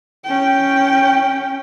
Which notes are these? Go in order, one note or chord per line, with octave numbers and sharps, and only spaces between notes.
C#4 G5